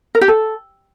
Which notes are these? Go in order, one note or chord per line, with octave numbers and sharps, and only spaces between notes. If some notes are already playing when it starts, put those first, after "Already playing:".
A#4
G4
A4